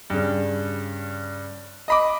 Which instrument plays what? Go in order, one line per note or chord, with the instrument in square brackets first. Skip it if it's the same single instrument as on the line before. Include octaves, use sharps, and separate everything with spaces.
[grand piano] G2 C#3
D#5 B5 D6